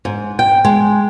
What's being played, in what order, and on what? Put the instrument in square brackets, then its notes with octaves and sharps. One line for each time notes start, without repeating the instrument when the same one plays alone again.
[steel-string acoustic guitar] G#2
G5
G#3